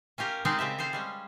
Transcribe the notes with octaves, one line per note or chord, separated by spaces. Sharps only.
C#4 F4 G4 A#4
G#3 C4 C#4 D#4 G#4 D5
C#3 C4 G4 E5
G#4 A4 C5 F5
G3 G#3 C#4